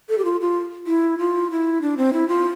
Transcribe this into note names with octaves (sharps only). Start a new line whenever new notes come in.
A4
G4
F4
F4
E4
F4
E4
D4
C4
E4
F4